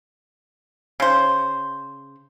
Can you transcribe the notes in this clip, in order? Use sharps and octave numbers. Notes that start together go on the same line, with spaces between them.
C#3 C5